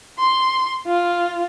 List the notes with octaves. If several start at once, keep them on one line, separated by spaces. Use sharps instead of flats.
C6
F4